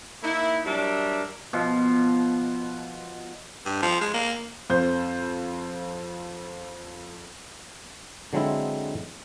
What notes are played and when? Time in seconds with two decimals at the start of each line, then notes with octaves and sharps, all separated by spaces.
0.23 A#3 D#4 E4
0.65 F#3 G3 D4 A#4 E5
1.53 B2 F3
3.66 G2
3.82 F3
4.01 G#3
4.14 A#3
4.70 F2 C5 G6
8.33 D3 F#3 G#3 C4 E4